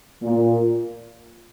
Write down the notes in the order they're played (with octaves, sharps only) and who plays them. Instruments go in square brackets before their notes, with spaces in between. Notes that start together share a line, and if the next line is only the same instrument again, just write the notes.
[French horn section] A#2